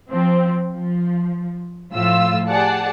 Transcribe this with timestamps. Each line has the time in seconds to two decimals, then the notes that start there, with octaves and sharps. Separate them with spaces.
0.10 F3 C4
0.73 F3
1.91 A2 F3 F4 E6
2.48 G4 G#4 D5 F#5 A5